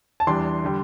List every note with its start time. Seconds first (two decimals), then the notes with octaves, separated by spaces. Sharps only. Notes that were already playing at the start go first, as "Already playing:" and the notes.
0.20 A5
0.27 E2 E3 G3 D4 C6
0.64 D3 G3